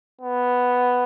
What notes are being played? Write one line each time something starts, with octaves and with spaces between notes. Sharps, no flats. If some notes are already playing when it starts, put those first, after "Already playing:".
B3